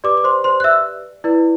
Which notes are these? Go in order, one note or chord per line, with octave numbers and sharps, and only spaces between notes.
G4 B4 D5 D6
D6
C5 C6
C5 C6
F#6
E5 E6
E4 B4 D5